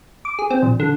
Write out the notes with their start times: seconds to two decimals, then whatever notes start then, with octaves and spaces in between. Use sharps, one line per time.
0.25 D6
0.39 G#4
0.50 C4
0.62 A#1
0.80 D3